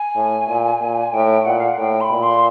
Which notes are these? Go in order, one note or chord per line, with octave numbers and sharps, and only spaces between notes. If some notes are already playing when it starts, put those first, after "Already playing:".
Already playing: G#5
A2
A#2
A#2
A2 G5
A#2 F#5
F5
F#5
A2 G5
C6
B5
A#2
C6